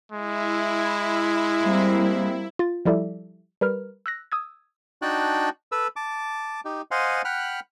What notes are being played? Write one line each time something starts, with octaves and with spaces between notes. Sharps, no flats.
G#3 E4
G3 A#3 C4
F4 A6
F3 G3 E4 A4 D5 E5
G3 A#4 B4 F6
E6 F#6 A#6
D#6 E6 G#6
D4 D#4 F#4 G5 A5 F#6
A4 B4 E6
A5 D6
D#4 G4
C5 D#5 F5 F#5 G#5 C6
F#5 G5 B5 F6 F#6